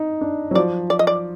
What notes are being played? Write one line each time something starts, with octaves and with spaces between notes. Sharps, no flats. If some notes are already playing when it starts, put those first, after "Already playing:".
Already playing: D#4
D4
F#3
F3 D5
D5
D#5
D5